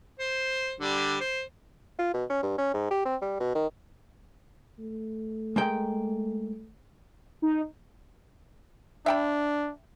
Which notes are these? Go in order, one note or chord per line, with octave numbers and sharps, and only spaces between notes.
C5
D3 G3
C5
F4
B2
C#4
G2
C#4
G#2
G4
C4
G3
B2
D#3
A3
G#3 A#3 G5
D#4
D4 E5 G5 B5